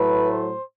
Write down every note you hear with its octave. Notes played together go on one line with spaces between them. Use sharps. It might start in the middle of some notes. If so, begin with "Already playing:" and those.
Already playing: A2 F#3 A3 B4
C5